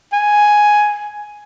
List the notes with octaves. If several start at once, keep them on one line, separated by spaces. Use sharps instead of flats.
G#5